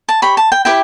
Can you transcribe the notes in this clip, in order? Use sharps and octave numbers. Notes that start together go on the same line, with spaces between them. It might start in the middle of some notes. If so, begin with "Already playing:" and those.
A5
G4 C#5 B5
A5
G5
E4 G4 B4 G5